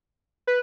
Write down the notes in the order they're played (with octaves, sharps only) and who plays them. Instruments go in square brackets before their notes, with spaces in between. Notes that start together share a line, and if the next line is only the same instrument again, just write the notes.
[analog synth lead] B4